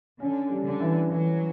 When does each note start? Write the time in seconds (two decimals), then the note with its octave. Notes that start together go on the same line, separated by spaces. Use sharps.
0.20 D3 C#4
0.50 G3
0.65 D3
0.80 E3
1.10 E3 F#3